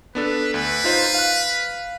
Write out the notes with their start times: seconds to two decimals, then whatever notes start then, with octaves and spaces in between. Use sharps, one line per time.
0.15 B3 D4 A4 B4
0.54 D2 B4
0.84 D#4 F4 C5
1.15 F5 F#6